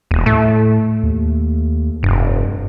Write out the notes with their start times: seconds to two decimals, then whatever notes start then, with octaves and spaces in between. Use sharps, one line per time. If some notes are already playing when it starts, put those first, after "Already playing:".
0.11 E1 D#2
0.26 A2 A3
1.03 D#2
2.03 F1 G2